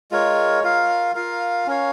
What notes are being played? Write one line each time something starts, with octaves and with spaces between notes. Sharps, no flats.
G#3 F4 A#4 C#5
F4 A#4 F5
F4 A#4 F5
C#4 A#4 C#5 F5